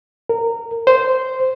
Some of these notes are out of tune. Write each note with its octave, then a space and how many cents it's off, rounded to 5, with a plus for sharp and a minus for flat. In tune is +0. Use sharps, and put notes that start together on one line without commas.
A#4 -20
C5 -10